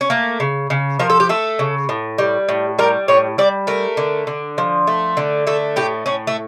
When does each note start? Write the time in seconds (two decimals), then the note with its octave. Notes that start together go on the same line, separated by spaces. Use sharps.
0.01 C#4
0.10 A3 A#3
0.40 C#3
0.70 C#3
0.99 F3 A#4
1.10 A4
1.20 G4
1.29 A3 A4
1.59 C#3
1.89 A2
2.18 G3
2.49 A2
2.79 G3 A#4
3.08 A2 C#5
3.38 G3 D5
3.67 A3 A#4
3.97 D3
4.27 D3
4.58 F3
4.87 A3
5.17 D3
5.47 A3 A4
5.76 A2 G4
6.06 A2 C#4
6.27 A3